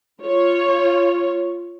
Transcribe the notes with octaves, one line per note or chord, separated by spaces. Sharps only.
F4 C#5